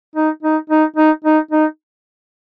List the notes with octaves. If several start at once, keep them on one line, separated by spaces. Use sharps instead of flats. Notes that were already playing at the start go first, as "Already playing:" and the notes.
D#4
D#4
D#4
D#4
D#4
D#4